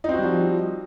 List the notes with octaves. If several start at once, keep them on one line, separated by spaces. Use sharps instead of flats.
F3 G3 C4 D#4 F#4